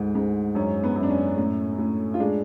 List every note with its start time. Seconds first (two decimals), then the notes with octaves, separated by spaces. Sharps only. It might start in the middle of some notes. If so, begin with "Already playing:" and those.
Already playing: D2 G#2
0.15 G#2
0.55 F#2 C#4
0.83 B3
0.96 F#2
1.03 D4
1.10 C#4
1.37 A2
1.78 A2
2.14 F4
2.20 G#3 D4